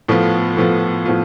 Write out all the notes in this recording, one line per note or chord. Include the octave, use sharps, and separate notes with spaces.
A2 F3 B3 F4
A2 F3 B3 F4
A2 F3 B3 F4